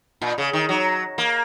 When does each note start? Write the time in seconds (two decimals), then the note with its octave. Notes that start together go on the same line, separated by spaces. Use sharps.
0.22 A#2
0.38 C#3
0.53 D#3
0.69 F#3
1.18 A#3